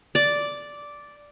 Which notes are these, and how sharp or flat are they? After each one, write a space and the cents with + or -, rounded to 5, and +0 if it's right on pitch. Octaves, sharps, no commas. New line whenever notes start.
D5 -5